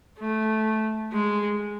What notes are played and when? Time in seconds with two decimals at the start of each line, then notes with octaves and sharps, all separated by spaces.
0.19 A3
1.12 G#3